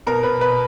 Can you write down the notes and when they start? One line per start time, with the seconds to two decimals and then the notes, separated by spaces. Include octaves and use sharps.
0.07 B2 A#4
0.23 B2 B4
0.41 B2 B4